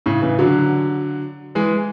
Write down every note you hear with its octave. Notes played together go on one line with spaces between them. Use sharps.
A2 C#3
C#3 E3
D3 F#3
E3 G#3